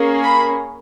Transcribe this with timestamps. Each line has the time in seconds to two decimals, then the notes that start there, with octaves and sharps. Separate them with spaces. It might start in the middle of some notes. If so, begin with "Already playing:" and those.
Already playing: A#3 C#4 G#4
0.23 B5